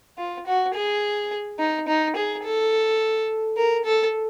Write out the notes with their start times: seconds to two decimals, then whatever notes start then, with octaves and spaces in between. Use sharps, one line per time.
0.18 F4
0.46 F#4
0.74 G#4
1.59 D#4
1.88 D#4
2.16 G#4
2.44 A4
3.57 A#4
3.85 A4